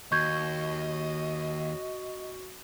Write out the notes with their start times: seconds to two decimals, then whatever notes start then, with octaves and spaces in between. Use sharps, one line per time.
0.12 D#2 F#4 D#5 C#6 G6 G#6